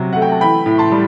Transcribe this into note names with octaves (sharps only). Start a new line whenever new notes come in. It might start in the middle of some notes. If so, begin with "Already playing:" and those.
Already playing: C3 F#3
A3 F#5
G5
A5
E3 G5 B5
A2
A5 C6
G3